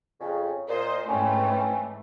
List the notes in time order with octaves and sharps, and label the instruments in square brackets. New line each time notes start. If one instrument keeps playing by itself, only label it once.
[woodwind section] F2 C#3
[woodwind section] A#2 [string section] C5 D#5
[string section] G#2 E3 A3 [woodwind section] C4 C#4